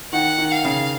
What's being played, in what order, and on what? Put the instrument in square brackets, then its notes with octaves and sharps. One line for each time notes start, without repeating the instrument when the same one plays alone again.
[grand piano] D#3 [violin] F#5
[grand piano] D#3
[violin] F5
[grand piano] C#3